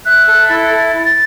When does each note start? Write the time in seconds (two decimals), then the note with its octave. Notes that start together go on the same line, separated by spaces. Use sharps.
0.05 E5 F#6
0.28 A4
0.50 E4 A6